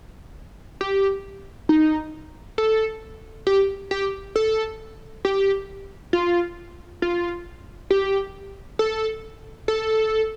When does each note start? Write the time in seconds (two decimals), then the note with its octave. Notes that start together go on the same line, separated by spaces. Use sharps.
0.81 G4
1.69 D#4
2.58 A4
3.47 G4
3.91 G4
4.36 A4
5.25 G4
6.13 F4
7.02 F4
7.91 G4
8.79 A4
9.68 A4